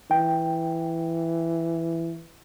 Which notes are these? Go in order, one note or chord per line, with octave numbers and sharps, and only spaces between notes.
E3 G5